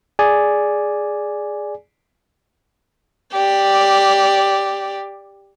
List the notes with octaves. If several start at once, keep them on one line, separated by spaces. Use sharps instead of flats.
G#4 D5 G#5
G4 D5